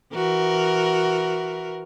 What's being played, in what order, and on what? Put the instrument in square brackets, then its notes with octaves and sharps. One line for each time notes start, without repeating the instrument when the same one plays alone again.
[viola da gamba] E3 F#4 A#4